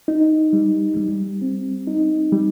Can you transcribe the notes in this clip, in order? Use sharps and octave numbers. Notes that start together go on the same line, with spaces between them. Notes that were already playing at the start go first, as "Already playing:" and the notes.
D#4
G3
G3
C4
D#4
G3